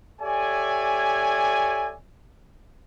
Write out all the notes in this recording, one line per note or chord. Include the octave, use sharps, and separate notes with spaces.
G4 A4 C#5 D5 E5 G#5